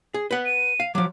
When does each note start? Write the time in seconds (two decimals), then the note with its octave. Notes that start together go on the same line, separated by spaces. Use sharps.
0.14 G#4
0.31 B4 F#5
0.46 D#7
0.80 F5
0.95 F3 F#3 D6